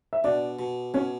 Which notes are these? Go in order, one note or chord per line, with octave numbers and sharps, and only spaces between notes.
E5
B2 D4 D5
B2
B2 C#4 C#5